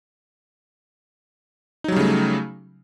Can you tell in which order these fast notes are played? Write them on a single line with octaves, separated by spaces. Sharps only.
D#4 F#3 G3 C#3 A3